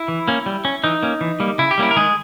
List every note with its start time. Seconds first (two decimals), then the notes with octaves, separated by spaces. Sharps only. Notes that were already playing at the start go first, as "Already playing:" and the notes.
Already playing: E4
0.08 E3
0.28 A#3 C#4
0.46 G3
0.65 C#4
0.84 E3 D#4
1.03 A#3 C#4
1.21 E3
1.40 G3 A#3
1.58 C#3 E4
1.71 G4
1.78 G3 A#3 C#4 E4
1.91 A#4
1.96 D#3 G#3 G#4